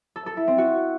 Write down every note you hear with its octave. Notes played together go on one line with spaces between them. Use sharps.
A4
A4
E4
C4
F#4